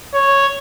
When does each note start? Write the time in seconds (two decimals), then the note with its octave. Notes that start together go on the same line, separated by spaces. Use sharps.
0.14 C#5